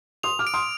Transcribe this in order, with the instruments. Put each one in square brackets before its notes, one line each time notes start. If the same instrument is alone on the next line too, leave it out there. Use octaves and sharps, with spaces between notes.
[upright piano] C6 D#6 [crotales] F7
[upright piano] D6 F6
[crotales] D7
[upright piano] C6 D#6